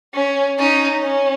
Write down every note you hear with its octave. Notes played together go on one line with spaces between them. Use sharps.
C#4
C#4 D#4
C#4